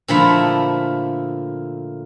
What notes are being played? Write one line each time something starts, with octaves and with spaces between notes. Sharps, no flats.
A#2 D3 F3 A3 E4 B5